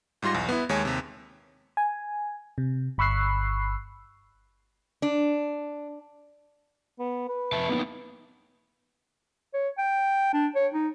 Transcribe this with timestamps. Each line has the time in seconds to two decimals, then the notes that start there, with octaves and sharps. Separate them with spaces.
0.22 G#2 G3 F4 C6 A#6
0.34 B1 E2
0.49 B3 E4
0.69 D#2 G#3 C#5 G#5
0.85 D#2 C3
1.77 G#5
2.58 C3
2.98 G1 B5 C#6 E6 F#6 C7
5.02 D4
6.99 B3
7.29 B4
7.53 F2 E5 A5
7.69 A#3 B3 D#4
9.54 C#5
9.78 G5
10.33 D4
10.56 C#5
10.74 D#4